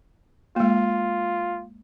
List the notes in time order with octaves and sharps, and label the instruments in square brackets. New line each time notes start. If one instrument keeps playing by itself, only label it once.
[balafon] G#3 A#3 [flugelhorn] F4